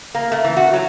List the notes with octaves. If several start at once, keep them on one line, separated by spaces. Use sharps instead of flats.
A#3
A3
E3
F#4
F#3